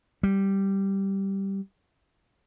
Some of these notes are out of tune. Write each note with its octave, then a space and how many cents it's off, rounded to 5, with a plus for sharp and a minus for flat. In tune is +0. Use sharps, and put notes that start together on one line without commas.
G3 -5